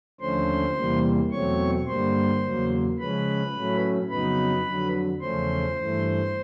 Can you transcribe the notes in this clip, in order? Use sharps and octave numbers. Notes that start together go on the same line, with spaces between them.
D#2 D3 F3 A3 C#4 C5 C6
E2 C3 E3 G3 A#3
E2 B2 F#3 A3 C4 C#5 C#6
G2 D3 G3 A#3 C5 C6
E2 C#3 F#3 A#3
C#3 F3 G#3 C#4 B4 B5
A2 F#3 A3 C#4
F2 C#3 F#3 B3 D#4 B4 B5
F2 D3 F#3
E2 C#3 F3 A3 C#4 C5 C6
G2 E3 A3